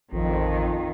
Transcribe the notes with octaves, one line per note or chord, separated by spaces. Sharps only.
A1 F2 D#3